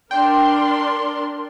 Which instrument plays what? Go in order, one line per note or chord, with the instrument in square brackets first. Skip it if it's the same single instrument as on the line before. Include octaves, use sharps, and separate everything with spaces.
[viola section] D4 A#4 C6 [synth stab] G5